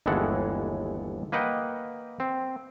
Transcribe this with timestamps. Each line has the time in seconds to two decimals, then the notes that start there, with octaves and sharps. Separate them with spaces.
0.06 G1 D#2 E3 G#3 A4 F#5
1.32 A#3 B4 D#5 F#5 G5
2.20 C4